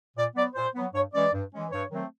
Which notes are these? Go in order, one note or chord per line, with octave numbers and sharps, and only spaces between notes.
A#2 D5
F#3 B3 D5
A#2 C5
F#3 B3
G2 C#5
E3 G#3 C#4 D5
G2
E3 G#3 C#4
G2 C#5
D#3 F#3 A3 C4